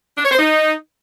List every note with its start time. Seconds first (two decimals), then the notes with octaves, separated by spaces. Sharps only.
0.17 D4
0.24 C#5
0.31 C5
0.38 D#4